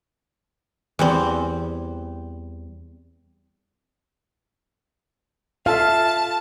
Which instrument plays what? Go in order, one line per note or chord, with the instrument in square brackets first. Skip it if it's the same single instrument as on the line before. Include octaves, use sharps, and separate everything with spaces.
[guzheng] E2 G3 C4
[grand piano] F4 A4 E5 [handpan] F5 [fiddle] A5